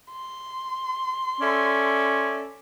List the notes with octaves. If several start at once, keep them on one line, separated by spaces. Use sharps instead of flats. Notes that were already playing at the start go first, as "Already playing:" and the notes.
C6
C#4 A4 D5 E5